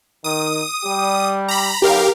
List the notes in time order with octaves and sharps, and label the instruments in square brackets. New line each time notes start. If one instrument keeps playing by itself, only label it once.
[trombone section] D#3 [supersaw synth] D#6
[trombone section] G3 G4
[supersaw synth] A#5 B5
[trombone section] B1 [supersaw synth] G4 A#4 F5